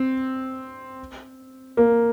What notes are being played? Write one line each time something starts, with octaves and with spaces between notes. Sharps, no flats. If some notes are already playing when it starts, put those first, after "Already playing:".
Already playing: C4
A#3